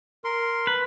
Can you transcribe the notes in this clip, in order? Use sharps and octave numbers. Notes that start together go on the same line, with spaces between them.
A#4 C6
B4